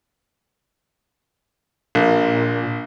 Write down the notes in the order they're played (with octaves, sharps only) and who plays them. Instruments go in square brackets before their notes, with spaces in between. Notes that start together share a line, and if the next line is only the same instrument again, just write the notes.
[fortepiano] A#1 [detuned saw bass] A#2